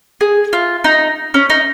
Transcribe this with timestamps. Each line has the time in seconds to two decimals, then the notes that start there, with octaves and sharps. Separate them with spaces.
0.21 G#4
0.53 F4
0.84 D#4
1.34 C#4
1.50 D#4